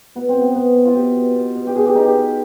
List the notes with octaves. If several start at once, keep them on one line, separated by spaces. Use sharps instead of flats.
B2 B3
C4
B2
B3
B2 B3
B2
F4
B2 G4
B2
B2
B2
G4
B2 G#4
G4
B2 D#4
G4
B2